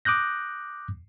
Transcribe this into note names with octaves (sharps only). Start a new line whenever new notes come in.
D6 D#6 F#6 G6 A#6